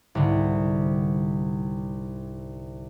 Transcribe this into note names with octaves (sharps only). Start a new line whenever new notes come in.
C2 G#2 D3